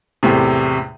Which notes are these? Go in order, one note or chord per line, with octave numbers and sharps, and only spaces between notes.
E2 A2 C3